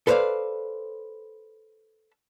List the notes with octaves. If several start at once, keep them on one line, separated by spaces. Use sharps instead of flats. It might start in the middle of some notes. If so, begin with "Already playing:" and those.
A4 B4 C5 D5 F5